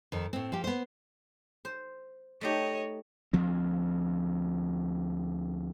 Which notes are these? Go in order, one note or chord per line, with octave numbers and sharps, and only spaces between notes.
F2 D#3
A2 C4
F3 G4
B3 C5
C5
A3 D#4 G4 C#5 D#5
D2 F3 C4